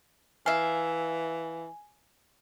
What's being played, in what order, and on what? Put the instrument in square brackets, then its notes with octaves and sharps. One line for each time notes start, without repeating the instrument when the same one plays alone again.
[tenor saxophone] E3 [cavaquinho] E5 F5 [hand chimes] G#5